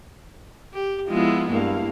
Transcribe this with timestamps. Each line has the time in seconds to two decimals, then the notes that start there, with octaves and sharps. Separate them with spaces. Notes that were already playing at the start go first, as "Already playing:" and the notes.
0.73 G4
1.08 F3 G#3 B3 E4 F4
1.50 G2 A#3 E4 F5